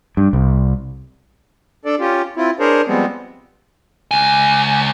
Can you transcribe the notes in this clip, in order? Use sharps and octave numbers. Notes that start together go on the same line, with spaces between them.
G2
C2
D4 A4 D5
C#4 F4 G4
C4 E4 F4
D4 G#4 A#4 C5 C#5
F3 G3 G#3 B3 C4
C#2 G#5